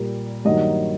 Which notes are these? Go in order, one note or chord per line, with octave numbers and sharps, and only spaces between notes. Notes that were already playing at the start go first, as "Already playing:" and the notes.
Already playing: A#2 G3 A#3
G2 D#3 F#3 A#3 D#5